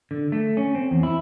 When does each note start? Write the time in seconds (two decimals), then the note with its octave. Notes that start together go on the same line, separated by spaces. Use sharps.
0.11 D3
0.32 A3
0.57 C#4
0.75 C4
0.91 E2
1.03 E4